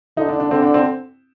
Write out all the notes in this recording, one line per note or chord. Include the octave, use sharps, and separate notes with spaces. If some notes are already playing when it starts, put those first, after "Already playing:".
D3 D#4
D4
D4
D3 C4
D4
C4